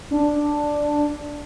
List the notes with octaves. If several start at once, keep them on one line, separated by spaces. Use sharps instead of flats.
D4